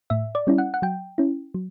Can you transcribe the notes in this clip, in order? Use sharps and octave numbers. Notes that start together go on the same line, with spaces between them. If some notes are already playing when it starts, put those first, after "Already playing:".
A2 E5
D5
G3 C#4 E4
F#5
F#5
F#3 G5
C#4 E4
F#3